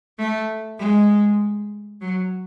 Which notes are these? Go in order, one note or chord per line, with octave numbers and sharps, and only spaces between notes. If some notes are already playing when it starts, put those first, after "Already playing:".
A3
G#3
F#3